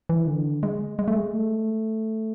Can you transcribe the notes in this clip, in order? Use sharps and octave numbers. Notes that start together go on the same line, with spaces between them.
E3
D3
G#3
G#3
A3
G#3
A3